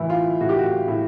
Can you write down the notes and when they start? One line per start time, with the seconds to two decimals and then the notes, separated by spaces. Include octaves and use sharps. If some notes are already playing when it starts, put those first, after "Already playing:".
Already playing: A2 E3 E4
0.10 F4
0.40 A2 F#4
0.49 G4
0.59 F#4
0.88 A2